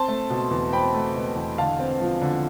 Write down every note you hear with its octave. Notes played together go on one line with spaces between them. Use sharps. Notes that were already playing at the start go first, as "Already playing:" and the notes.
Already playing: C4 A5 C6
A3
B2
E2
C4 G5 B5
A3
B2
E2
D3 F5 A5
C4
F3
D3